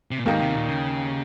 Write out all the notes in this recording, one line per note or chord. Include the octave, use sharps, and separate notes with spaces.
C3
A#2
D#2 G#2 D#3 A#3 D#4
C3
A#2
C#3